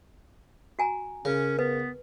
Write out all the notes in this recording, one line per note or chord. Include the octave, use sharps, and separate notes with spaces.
F#4 G#5 A#5
C#3 C#4 A#4
B3 B4